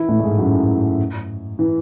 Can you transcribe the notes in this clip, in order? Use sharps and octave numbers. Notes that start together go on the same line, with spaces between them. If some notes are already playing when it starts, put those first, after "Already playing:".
Already playing: E3 E4
A2 A3
A3
G#2 G#3
F#2 F#3
E3